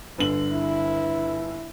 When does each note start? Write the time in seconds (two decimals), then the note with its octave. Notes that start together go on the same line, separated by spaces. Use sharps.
0.18 G1 D3 F#7
0.53 E4